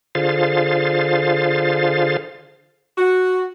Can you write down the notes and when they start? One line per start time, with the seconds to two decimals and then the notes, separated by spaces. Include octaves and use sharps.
0.15 D3 F4 G#4 C5 F5 A6
2.98 F#4